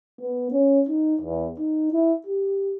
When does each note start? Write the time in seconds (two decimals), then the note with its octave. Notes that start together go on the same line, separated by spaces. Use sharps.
0.19 B3
0.52 C#4
0.89 D#4
1.21 E2
1.59 D#4
1.93 E4
2.27 G4